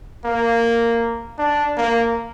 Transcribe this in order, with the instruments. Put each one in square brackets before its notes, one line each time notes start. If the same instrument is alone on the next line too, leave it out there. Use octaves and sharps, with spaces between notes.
[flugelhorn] A#3
D4
A#3